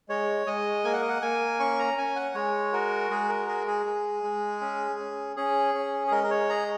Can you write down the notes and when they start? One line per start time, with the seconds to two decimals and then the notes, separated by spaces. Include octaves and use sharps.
0.09 G#3 C#5
0.47 G#3 D#5
0.84 A#3 G#5
0.93 F#5
1.01 D#5
1.09 F#5
1.22 A#3 G#5
1.60 C#4 C#6
1.79 A#5
1.98 C#4 G#5
2.16 F#5
2.35 G#3 C#5
2.73 F#4 A#4
3.10 G#3 G#4
3.29 A#4
3.48 G#4 A#4
3.67 G#4
3.86 G#3
4.23 G#3
4.61 C#4
4.99 C#4
5.36 C#4 G#4
5.74 C#4
6.08 G#4
6.12 G#3 A#4
6.24 A#4
6.31 C#5
6.49 G#4 A#5